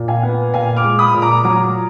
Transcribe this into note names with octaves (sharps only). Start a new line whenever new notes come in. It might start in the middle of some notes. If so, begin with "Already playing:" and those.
Already playing: A#2
F5 G#5
B3
A#2 F5 G#5
D6 F6
G#3
B5 D#6
A#2
A#5 D6
F#3 A#5 D6